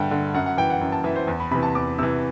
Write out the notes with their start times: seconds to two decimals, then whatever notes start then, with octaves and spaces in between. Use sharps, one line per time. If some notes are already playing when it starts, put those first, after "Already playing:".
Already playing: G2 D3 E5 F#5 G5
0.11 D3
0.34 F#2 F#5
0.46 F#5
0.58 E3 G5
0.70 F#5
0.81 F#2
0.92 A5
1.04 E3 E5
1.16 C5
1.27 E2
1.40 B5
1.51 C3 E3 B5
1.63 A5
1.75 E2 D6
1.99 C3 E3 E6